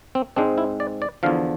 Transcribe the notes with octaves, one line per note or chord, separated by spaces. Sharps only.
C4
G#2 G#3 C4 D4
E4
D5
D5
E2 D3 F3 F5